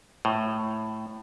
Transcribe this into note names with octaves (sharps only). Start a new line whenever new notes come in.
A2